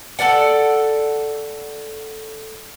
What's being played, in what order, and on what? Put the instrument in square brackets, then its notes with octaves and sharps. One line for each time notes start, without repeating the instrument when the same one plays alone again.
[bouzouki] A4 B4 D5 F#5